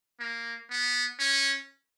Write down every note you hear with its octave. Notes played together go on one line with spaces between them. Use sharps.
A#3
B3
C#4